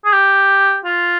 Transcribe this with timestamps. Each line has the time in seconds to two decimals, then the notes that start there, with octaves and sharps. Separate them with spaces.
0.05 G#4
0.13 G4
0.85 F4